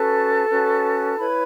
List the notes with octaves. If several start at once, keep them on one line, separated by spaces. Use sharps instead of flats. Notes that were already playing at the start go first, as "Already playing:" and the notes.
Already playing: C#4 F#4 A4 B4 A5
C#4 F#4 B4
E4 B4 C#5 B5